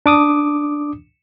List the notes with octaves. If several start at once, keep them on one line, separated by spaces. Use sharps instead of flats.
D4 D6 D#6